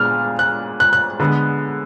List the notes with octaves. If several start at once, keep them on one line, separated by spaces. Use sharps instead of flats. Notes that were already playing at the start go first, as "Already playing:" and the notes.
Already playing: A#2 G#3 B3 D4 F6
F#6
F#6
F#6
D3 G#3 B3